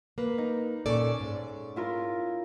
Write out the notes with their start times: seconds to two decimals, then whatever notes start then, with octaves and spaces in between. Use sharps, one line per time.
0.18 A#3 B4
0.38 D#4
0.86 A#2 C#4 A4 D5 C#6
1.21 G#2
1.76 E4 F4 A#4